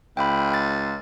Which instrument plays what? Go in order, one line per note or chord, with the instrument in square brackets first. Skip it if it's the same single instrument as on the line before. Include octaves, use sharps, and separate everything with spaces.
[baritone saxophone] C#2 [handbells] G5 B5
[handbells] A6